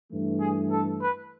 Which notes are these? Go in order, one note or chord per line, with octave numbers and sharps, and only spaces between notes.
G2 E3 A3
G#4
A4
B4